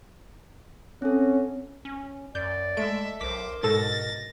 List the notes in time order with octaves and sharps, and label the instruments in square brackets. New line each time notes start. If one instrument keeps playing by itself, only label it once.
[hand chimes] C4 A4 [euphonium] C#4
[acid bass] C#4
[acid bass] F#2 [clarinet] D5 [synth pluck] G6
[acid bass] G#3 [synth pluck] A3 D7 [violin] A4 E5
[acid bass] B1 [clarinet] A#4 [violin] C5 D6 [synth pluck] B6
[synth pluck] G#2 A4 E7 [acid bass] B2 [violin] A6 A#6